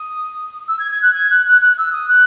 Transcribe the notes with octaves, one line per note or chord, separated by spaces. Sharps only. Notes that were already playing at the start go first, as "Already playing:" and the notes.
Already playing: D#6
E6
G#6
G#6
F#6
G#6
F#6
F#6
F#6
E6
D#6
F#6